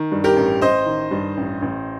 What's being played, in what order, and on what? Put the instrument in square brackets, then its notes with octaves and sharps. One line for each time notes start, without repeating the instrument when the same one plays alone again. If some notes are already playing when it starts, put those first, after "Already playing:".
Already playing: [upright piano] D#3
G2
[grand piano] G4 A#4
[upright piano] A1
[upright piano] A1 [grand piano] C5 D#5
[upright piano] D#3
G2
A1
A1